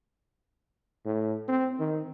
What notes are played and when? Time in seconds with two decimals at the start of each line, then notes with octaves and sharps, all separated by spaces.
1.05 A2
1.48 C4
1.79 D#3